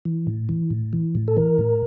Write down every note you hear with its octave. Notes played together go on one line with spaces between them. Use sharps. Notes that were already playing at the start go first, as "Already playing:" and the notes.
E3
A2
E3
A2
E3
A2
A4
E3 A#4
A2